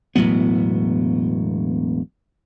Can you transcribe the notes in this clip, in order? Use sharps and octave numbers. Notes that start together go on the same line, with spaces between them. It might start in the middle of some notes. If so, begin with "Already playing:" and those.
E1 A2 F#3 B3